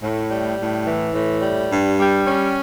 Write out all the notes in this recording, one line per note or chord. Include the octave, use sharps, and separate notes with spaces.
A2
G3
A2
E3
A2
G3
G2
G3
C#4